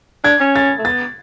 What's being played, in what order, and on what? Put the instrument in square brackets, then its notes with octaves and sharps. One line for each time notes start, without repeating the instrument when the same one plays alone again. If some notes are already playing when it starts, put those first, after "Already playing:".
[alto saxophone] D4 [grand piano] G#6
[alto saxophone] C#4
[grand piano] A6
[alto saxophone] A3
[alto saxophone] B3 [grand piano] A6